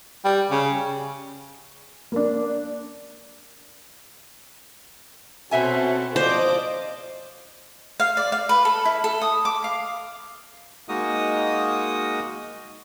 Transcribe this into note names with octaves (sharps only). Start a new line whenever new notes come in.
G3
C#3
A#3 D4
B2 C4 C#4 F#4 A4 E5 G#5
F3 C5 D5 D#5 F5 D6
F5
D5
F5
B4
A4
E4
A4
D#6
D6
F5
G#3 A#3 D#4 F#4 D#5 D#6